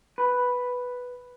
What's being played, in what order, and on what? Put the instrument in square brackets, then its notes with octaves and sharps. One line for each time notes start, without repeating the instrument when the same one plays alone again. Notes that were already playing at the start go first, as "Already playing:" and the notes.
[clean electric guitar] B4